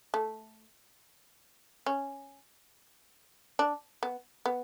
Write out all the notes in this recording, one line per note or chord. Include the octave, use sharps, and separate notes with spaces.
A3
C#4
D4
B3
B3